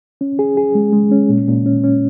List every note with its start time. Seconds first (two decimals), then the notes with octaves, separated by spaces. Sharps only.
0.21 C#4
0.39 G#4
0.57 G#4
0.75 G#3
0.93 G#3
1.12 C#4
1.29 A#2
1.48 A#2
1.66 C#4
1.84 C#4